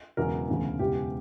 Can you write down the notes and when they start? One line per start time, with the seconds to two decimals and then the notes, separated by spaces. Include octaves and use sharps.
0.17 E1 E2 C#3 F#3 A#4
0.48 E1 D2 C#3 E3
0.79 E1 E2 C#3 G4